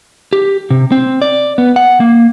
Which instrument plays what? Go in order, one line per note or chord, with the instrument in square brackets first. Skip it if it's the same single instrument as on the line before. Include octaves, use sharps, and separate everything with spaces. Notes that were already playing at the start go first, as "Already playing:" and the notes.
[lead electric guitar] G4
C3
C4
D5
B3
F#5
A#3